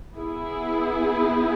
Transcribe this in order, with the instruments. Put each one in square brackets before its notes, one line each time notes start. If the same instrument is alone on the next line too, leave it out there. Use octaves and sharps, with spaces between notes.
[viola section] B3 E4 G#4